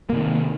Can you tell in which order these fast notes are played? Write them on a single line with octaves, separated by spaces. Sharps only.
A#3 C3 D#3